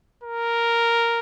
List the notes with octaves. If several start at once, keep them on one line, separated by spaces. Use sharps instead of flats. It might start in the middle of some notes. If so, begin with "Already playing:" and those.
A#4